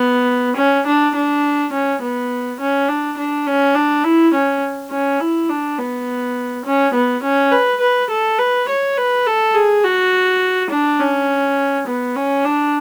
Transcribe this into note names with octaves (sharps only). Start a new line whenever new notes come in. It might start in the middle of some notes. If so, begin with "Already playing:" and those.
Already playing: B3
C#4
D4
D4
C#4
B3
C#4
D4
D4
C#4
D4
E4
C#4
C#4
E4
D4
B3
C#4
B3
C#4
B4
B4
A4
B4
C#5
B4
A4
G#4
F#4
D4
C#4
B3
C#4
D4